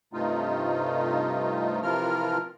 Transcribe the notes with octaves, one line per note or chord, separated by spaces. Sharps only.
G2 C3 A3 D#4 F4
C3 E3 F3 F4 A#4 F6